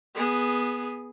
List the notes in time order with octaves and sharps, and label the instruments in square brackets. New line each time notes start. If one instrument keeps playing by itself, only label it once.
[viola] B3 G#4